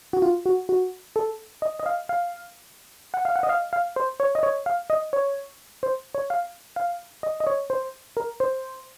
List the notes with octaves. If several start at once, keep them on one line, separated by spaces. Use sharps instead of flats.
F#4
F4
F#4
F#4
A4
D#5
D#5
F5
F5
F#5
F5
F#5
D#5
F5
F5
C5
C#5
D#5
C#5
F5
D#5
C#5
C5
C#5
F5
F5
D#5
D#5
C#5
C5
A#4
C5